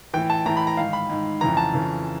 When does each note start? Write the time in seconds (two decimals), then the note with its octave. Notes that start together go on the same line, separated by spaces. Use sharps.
0.14 A2 E3 G5
0.30 A5
0.46 A2 E3 A#5
0.57 B5
0.67 A#5
0.77 G#2 D#3 F5
0.93 B5
1.10 G#2 D#3
1.41 F2 C#3 E3 A#5
1.57 A5
1.73 F2 C#3 E3